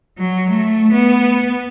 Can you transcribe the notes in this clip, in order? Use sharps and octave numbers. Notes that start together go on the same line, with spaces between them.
F#3
A3
B3